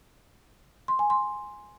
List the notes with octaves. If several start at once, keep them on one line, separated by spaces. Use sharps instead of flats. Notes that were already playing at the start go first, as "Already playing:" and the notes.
C6
G#5
C6